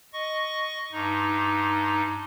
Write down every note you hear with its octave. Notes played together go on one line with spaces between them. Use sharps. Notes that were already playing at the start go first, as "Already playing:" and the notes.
D#5 C#6
G2 D#4